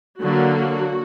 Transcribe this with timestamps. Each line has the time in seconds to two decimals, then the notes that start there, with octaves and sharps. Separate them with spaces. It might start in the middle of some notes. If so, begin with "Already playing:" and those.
0.22 D3 F#3 A#3 F#4